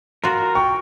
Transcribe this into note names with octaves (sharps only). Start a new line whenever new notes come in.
F4 F#4 A#4
G5 C#6